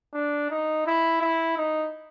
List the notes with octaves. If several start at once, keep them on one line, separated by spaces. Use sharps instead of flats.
D4
D#4
E4
E4
D#4